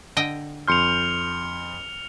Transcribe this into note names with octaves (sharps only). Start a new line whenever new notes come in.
D3 D#5 G5
F2 C6 F6 G6 C#7 F7